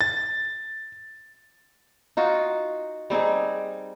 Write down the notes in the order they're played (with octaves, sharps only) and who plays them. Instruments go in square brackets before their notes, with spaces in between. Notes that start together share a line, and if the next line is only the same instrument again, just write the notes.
[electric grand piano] A6
[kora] D#4 F4 F#4
G3 C4 D#4 G#4